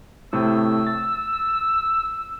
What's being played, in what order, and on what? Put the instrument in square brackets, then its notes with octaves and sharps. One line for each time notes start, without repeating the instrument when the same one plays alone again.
[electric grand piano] A2 C3 A3 [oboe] E6
[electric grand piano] A6